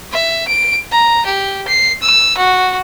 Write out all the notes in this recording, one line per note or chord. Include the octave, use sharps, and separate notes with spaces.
E5
D7
A#5
G4
C7
E6
F#4